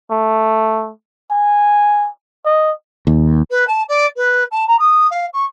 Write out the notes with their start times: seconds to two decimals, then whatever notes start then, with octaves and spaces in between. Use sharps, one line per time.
0.11 A3
1.31 G#5
2.45 D#5
3.07 D#2
3.50 B4
3.67 A5
3.88 D5
4.16 B4
4.51 A5
4.67 A#5
4.79 D#6
5.10 F5
5.33 C#6